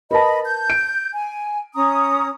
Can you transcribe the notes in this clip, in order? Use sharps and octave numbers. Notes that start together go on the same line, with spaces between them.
A#4 B4 D#5 A5 B5
G6
D7
G#5
C#4 A#5 D#6